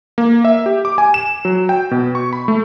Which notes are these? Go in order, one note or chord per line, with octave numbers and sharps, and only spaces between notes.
A#3
E5
G4
D6
G#5
E7
F#3
G5
B2
C#6
B5
A3